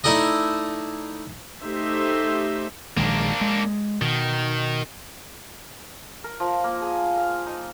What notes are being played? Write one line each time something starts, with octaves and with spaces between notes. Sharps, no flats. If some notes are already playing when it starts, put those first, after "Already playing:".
A3 D#4 E4 A4 D5 D#5
A3 D#4 G4 C5 E5
A#1 D#3 G#3 A#3 D4
G#3
B2 D#3
A#4
F3
A#3
G#4
F5
D#4